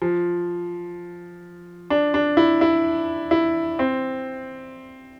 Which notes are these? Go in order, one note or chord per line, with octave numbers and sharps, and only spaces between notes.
F3
D4
D4
E4
E4
E4
C4